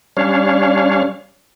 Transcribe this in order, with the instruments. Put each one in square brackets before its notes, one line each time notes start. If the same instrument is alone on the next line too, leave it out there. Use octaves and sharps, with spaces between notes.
[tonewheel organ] G3 C#4 D4 C#5 F5